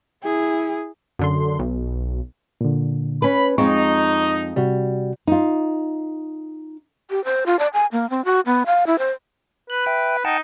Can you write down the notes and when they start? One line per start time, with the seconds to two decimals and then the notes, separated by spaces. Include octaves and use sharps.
0.24 E4 G#4
1.19 F#2 D3 C6
1.59 B1
2.61 A#2 D3
3.22 C#4 B4 B5
3.58 F2 G#3 C4 D#4 C#6
4.56 C3 G3 F#4
5.27 D#4 F4
7.10 G4
7.25 C5
7.46 F4
7.59 D5
7.74 G#5
7.92 A#3
8.10 C4
8.25 F#4
8.46 B3
8.66 F5
8.87 E4
8.99 C5
9.70 B4 F#6
9.86 E5 G5
10.25 D#4 F#5 G5 A5